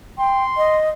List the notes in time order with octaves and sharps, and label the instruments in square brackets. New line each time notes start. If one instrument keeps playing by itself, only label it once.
[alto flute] G5 [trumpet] C6
[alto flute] D#5